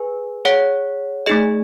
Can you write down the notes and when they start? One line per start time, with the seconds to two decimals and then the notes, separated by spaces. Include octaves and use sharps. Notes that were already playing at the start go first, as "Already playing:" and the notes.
Already playing: G#4 B4 G#5
0.45 G#4 C#5 F#5
1.26 A3 D#4 G#4 D#5